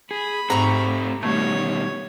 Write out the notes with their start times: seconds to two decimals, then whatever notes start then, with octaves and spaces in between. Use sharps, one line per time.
0.11 G#4 B5
0.50 G#2 A3 C4 G4 A#5 C#6
1.23 B2 D#3 G3 A3 C#5